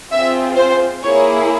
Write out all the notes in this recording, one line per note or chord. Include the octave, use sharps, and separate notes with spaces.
C4 F4 G#4 E5
C5
A#3 E4 G#4 C#5